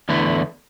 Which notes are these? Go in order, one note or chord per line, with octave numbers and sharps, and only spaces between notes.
E2 D3 A3 E4